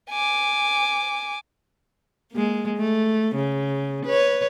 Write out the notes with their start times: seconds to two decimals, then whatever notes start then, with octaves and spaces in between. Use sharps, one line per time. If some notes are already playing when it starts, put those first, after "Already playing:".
0.11 G#5 D6
2.32 G#3 A#3
2.76 A3
3.35 C#3
4.05 B4 C#5